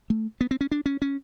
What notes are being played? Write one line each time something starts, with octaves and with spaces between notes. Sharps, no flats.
A3
B3
C4
C#4
D4
C#4
C#4